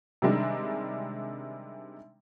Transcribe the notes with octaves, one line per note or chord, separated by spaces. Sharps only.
C3 D#3 G3 G#3 D4